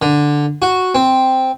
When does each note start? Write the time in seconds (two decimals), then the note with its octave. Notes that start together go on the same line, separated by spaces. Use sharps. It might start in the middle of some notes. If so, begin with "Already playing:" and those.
0.02 D3
0.62 F#4
0.95 C4